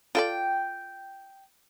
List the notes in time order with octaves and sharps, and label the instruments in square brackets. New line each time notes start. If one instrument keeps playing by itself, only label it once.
[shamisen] F4 A4 D5 [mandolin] G5